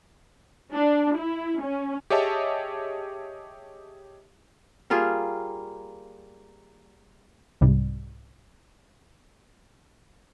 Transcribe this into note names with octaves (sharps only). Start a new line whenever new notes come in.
D4
E4
C#4
G4 G#4 C#5 D#5 E5 A5
G3 A#3 F4 G#4
C2 G#2 C3 G3